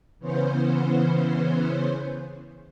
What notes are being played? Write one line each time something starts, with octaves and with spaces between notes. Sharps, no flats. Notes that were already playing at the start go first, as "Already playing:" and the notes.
C#3 E3 B3 C#4 C5